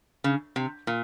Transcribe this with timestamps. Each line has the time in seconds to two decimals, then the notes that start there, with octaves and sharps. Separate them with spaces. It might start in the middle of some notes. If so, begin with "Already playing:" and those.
0.24 C#3
0.56 C3
0.87 A#2